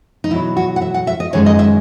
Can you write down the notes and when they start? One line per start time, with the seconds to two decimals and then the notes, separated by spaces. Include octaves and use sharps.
0.24 D#4
0.31 E2 B2 F#3 E4
0.57 F#4
0.76 F#5
0.82 E5
0.94 F#5
1.07 E5
1.20 D#5
1.33 F#2 D#3 G#3 C#5
1.46 D#5
1.59 E5